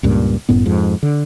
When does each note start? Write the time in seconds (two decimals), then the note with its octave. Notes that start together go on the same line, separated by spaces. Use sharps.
0.03 C#2 G2 A#2
0.49 G1 F#2 A2 B3
0.66 F2 G#2
1.03 D3